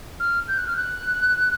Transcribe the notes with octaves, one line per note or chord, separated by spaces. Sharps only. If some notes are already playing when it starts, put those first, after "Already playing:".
F6
G6
F#6
F6
F#6